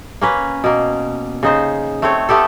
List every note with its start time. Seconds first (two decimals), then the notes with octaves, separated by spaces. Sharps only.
0.21 A#3 C#4 B4
0.64 B2 A#3
1.43 C#3 D#4 C5
2.02 A3 C4 C#5
2.29 A3 B3 G4 A4